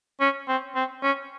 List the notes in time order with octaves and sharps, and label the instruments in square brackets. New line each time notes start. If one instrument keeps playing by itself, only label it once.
[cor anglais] C#4
C4
C4
C#4